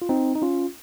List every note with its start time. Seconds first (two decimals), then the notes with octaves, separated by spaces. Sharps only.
0.02 F4
0.09 C4 D#4
0.35 D#4
0.42 C#4 F4